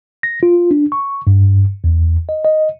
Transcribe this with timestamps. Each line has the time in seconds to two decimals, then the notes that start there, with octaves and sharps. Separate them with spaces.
0.23 A#6
0.43 F4
0.71 D4
0.92 C#6
1.27 G2
1.84 E2
2.29 D#5
2.45 D#5